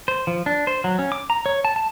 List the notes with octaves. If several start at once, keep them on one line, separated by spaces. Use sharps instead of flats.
C5
F3
D4
C5
F#3
C#4
D6
A#5
C#5
A5
A5